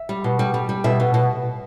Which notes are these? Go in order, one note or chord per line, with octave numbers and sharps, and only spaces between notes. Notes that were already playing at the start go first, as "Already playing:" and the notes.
Already playing: E5
G3
B2
G3
G3
G3
B2 E5
B2
B2